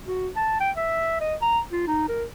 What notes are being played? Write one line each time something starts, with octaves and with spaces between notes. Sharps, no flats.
F#4
A5
G5
E5
D#5
A#5
F4
D#4
A#4